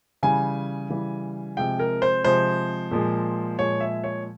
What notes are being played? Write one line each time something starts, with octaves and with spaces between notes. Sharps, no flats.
C#3 E3 G3 G#5
C#3 E3 G3
C3 F3 G#3 G5
A#4
C5
C3 F3 G#3 C5
A#2 F3 G#3
A#2 F3 G#3 C#5
E5
C#5